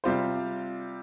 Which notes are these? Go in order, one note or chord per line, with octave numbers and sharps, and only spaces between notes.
C3 G3 F4 C5